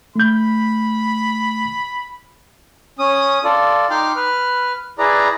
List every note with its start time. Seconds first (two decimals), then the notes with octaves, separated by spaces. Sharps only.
0.16 A3 B5 G6
2.99 C#4 D#6
3.44 F4 A4 D5
3.90 D#4 G5 C6 D6 F6
4.16 B4 F6
4.98 E4 G#4 B4 D5 A#5